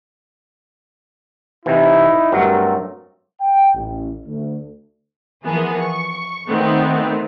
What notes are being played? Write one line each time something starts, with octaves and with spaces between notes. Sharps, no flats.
C3 E3 D#4 E4
G2 F#3 A3 C4 A#4
G5
A1
D2
E3 F3 B3 G#4 A#4
C#6
D#3 A3 B3 C4